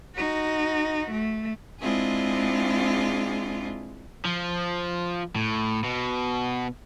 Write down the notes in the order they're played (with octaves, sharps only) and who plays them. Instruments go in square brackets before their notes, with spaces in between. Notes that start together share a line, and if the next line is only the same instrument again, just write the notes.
[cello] D#4 F#4
A3
[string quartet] G#3 C4 D4 E4 F4 G#4
[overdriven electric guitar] F3
A2
B2